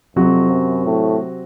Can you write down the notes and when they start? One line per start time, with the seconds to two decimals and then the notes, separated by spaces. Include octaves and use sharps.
0.16 F2 C3 F#3 C4 F#4
0.50 F#2
0.86 A2